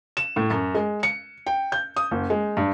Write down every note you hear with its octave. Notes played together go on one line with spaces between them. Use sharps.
E7
A2
F#2
G#3
C#7
G5
G6
D#6
F#1
G#3
G2